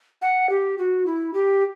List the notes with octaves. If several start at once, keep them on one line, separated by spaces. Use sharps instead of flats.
F#5
G4
F#4
E4
G4